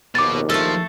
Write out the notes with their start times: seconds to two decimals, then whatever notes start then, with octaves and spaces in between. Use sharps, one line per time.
0.15 A#1 D#2 B2 D6 A6
0.50 F3 A3 A4